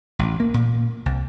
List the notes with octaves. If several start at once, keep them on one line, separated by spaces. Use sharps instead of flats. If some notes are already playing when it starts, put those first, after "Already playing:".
A1
A#3
A#2
C2